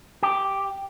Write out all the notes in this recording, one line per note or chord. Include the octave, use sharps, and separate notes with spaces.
G4